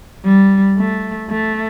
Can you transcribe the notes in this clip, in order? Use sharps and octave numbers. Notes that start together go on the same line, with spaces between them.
G3
A3
A3